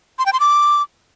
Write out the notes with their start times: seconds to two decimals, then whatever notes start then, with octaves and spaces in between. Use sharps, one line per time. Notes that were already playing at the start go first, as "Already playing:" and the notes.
0.19 C6
0.26 G5
0.33 C6
0.40 D6